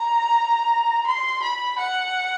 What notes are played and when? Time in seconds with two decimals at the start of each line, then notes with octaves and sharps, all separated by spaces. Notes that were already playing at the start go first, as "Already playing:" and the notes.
Already playing: A#5
1.06 C6
1.42 B5
1.78 F#5